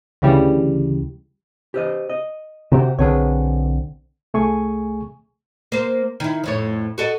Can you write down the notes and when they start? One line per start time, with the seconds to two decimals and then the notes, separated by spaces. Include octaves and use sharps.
0.22 D2 C#3 E3 G3
1.74 G4 C5 D#5
2.10 D#5
2.72 C3 C4 F#4 G4
2.99 B1 D3 C4 G#4 B4 C#5
4.34 C2 A3 G#4 G#5 C#6
5.72 A#3 C5
6.20 D#3 E4
6.44 F2 A2 C#5
6.98 F#4 A4 D#5